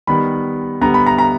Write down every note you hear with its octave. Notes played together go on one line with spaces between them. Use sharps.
D#3 G3 B3 B5
D3 G3 B3 A#5
B5
A#5
A#5